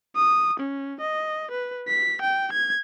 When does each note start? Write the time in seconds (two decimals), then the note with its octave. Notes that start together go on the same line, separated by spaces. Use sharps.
0.16 D#6
0.60 C#4
1.01 D#5
1.51 B4
1.88 B6
2.22 G5
2.53 G#6